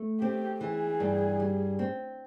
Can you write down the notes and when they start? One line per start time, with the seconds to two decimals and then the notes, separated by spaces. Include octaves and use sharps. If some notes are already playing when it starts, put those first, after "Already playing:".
Already playing: A3
0.21 C4 G4
0.61 E3 G#4
1.00 G2
1.40 G3
1.79 C4